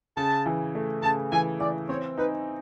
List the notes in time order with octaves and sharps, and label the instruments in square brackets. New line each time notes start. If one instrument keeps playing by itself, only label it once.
[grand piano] C#3 [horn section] A5
[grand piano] E3
A3
[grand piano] C#3 [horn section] A5
[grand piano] E3 [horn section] G#5
[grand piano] E3 [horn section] D5
[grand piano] C4 [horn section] C#5
[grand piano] D#4 [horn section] B4